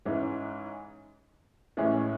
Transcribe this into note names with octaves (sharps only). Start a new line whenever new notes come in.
G#2 E3 G#3 C#4
A1 A2 E3 G#3 C#4